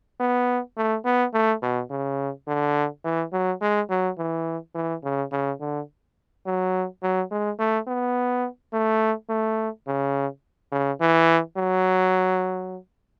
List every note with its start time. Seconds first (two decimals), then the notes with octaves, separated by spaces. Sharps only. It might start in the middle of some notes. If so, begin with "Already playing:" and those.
0.20 B3
0.77 A3
1.05 B3
1.34 A3
1.62 B2
1.90 C#3
2.47 D3
3.04 E3
3.33 F#3
3.62 G#3
3.90 F#3
4.18 E3
4.75 E3
5.04 C#3
5.32 C#3
5.60 D3
6.46 F#3
7.03 F#3
7.31 G#3
7.59 A3
7.87 B3
8.73 A3
9.29 A3
9.87 C#3
10.72 C#3
11.01 E3
11.57 F#3